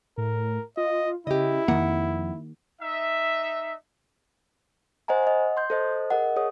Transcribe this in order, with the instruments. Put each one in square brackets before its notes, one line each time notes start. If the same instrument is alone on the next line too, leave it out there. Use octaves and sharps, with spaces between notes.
[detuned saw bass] A2 [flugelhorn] A#4
[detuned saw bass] F4 [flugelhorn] D#5
[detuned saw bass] C#3 [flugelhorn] E4 [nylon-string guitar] G4 D#5
[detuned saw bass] F2 [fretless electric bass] D#3 A#3 [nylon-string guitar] F#5
[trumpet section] D#4 E5
[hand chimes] C5 D#5 F#5 G#5 A#5
D#5 F#5
C6 G6
A4 C5 D#5
G#4 A#4 D#5 F#5
G#4 C#5 D#6